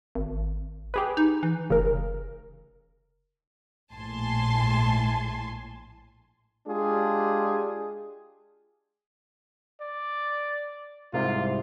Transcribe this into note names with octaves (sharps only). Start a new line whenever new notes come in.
G#1
G4 G#4 B4
D#4
E3
F1 C#3 A#4
A#1 A2 G#5 A5 C6
G#3 D4 F4 G4 G#4
D5
C2 G#2 C3 F4